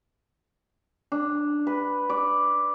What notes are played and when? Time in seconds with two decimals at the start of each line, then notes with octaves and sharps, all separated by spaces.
1.12 D4
1.67 B4
2.10 D5